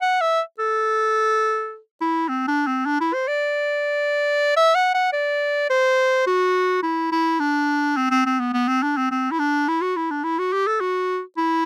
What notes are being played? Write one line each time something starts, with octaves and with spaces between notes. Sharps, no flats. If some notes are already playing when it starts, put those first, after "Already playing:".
F#5
E5
A4
E4
C4
D4
C4
D4
E4
C5
D5
E5
F#5
F#5
D5
C5
F#4
E4
E4
D4
C4
C4
C4
B3
B3
C4
D4
C4
C4
E4
D4
E4
F#4
E4
D4
E4
F#4
G4
A4
F#4
E4